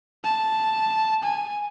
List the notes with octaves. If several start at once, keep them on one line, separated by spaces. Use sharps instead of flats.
A5
G#5